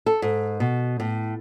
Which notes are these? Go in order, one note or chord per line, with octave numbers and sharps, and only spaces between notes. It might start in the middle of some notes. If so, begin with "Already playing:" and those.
A4
G#2
B2
A2